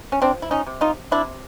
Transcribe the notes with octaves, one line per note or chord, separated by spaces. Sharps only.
C#4
F3 C4 D4
E4
C#4 D#4
C3
D#4 F4
C3 D4 E4